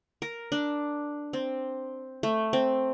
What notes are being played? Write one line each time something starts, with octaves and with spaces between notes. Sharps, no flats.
A#4
D4
C4
A3
C4